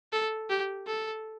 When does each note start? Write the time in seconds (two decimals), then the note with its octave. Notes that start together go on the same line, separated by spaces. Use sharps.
0.13 A4
0.50 G4
0.87 A4